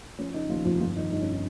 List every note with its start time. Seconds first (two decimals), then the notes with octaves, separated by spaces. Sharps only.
0.19 F3 C#4
0.34 C#3 D#4
0.49 D#2 F3 F4
0.64 F1 F3 F4
0.80 G1 F3 F4
0.95 D#3 D#4
1.12 G2 D#4
1.22 C#4
1.32 D#4